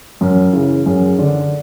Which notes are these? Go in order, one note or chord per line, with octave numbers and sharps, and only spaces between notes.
F#2
C#3 E3
F#2 G#4
D3